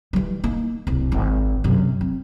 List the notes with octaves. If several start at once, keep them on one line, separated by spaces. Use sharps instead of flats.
E3 G3
A#3 D#4
D1 C2
G#1
F#2 C3
C4